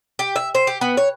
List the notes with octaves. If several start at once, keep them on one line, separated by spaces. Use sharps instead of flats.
G4
E5
C5
G4
B3
C#5